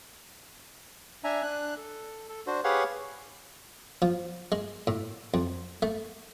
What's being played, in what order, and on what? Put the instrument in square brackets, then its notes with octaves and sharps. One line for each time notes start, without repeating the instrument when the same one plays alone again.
[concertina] D4 E5 G#5 A#5
D4 F#6
A4
A4
D4 F#4 C5
G4 G#4 B4 C#5 F5 F#5
[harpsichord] F3
G#3
A2
F2
A3